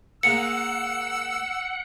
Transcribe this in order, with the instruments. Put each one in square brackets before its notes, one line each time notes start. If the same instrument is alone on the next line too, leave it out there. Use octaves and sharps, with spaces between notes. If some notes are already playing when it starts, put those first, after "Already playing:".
[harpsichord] G#3 A#3 G#4 [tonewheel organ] F#5 [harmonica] E6 [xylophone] C#7